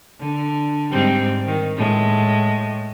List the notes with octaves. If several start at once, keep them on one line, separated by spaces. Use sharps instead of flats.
D3
G#2 G3 C4
D#3
A2 G#3